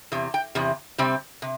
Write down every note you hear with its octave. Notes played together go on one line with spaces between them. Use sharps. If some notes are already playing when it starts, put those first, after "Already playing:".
E2 C3
G5
E2 C3
C3 G3 C4
C3